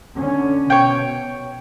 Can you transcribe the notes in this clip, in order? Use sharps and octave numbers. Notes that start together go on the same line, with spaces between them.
D3 C#4
B2 C#5 G5